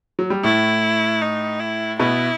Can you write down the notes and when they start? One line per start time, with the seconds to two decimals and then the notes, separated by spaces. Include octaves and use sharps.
0.19 F#3
0.30 G3
0.44 A2 A3 E4
1.22 D#4
1.60 E4
1.99 B2 B3 E4